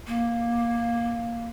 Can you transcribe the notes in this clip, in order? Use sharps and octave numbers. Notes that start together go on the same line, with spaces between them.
A#3